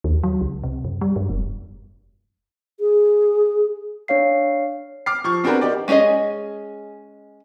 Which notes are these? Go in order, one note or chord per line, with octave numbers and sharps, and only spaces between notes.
D#2
F#3
C#2
C3
F#2
G3
G2
F1
G#4
D4 C#5 F5 C7
D6 F6 C7
F3 C#6
B3 C4 D4 F#4 A#4 B4
D#4 G4 D5
G#3 C#4 D4 G#4 D#5